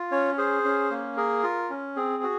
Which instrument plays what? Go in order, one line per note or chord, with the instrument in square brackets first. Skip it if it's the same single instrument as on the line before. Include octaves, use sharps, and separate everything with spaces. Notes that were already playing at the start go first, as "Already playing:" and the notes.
Already playing: [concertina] F4
C#4 C#5
G#4 C5
C#4
A#3
G#4 A#4
F4
C#4
C4 G#4
F#4